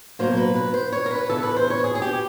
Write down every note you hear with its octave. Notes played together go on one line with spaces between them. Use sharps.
B2 F#3 A#3 C5
B4
B4
C5
C#5
A#4
B4
E2 C#3 E3 A4
B4
C5
C#5
G#4
G#4
G4